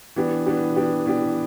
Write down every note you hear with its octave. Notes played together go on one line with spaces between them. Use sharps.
E3 B3 D4 G4
E3 B3 D4 G4
E3 B3 D4 G4
E3 B3 D4 G4